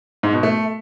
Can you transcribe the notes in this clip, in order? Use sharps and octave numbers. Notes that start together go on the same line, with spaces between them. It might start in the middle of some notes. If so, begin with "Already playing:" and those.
G#2
B2
A3